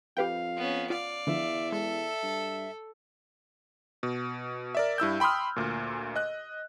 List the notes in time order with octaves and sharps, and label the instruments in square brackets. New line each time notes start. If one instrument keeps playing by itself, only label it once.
[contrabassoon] F2 [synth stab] G4 B4 G5 [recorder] F5
[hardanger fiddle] B3 C#4
[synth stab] F4 [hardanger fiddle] D5 F5
[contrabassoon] E2 [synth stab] D3 F3 [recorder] E5
[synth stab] G#3 [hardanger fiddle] A4
[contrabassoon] G2
[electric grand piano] B2
A#4 D5 E5
G2 E4 E6 G6
G5 B5 C6 D#6 F6
D2 A#2
D#5 F#6